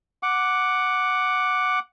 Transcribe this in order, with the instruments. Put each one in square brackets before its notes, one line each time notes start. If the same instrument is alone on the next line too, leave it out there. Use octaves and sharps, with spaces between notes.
[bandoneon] F#5 D6